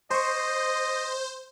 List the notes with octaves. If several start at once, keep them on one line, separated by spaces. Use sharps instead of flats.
C5 D#5 C6 C#6